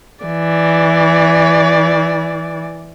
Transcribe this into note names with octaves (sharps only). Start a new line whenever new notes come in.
E3 D5